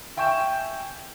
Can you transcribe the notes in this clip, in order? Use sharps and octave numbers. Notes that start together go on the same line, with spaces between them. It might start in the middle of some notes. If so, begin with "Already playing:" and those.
E5 G5 G#5 C#6 G6 E7